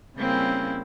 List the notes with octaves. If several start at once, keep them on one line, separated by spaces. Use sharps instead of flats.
C#3 G3 A#3 C4 C#4 E4